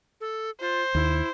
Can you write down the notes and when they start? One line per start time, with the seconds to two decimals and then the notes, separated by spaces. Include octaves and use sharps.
0.21 A4
0.61 F4 C5
0.95 D#2 E4